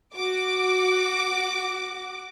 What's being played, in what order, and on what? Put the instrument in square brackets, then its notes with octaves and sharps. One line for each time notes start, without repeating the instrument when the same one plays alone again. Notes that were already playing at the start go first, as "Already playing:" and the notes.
[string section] F#4 D6